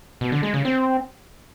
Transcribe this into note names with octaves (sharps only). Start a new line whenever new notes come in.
B2
D3
G#3
C#3
C4